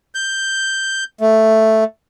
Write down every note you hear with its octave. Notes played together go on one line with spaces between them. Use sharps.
G6
A3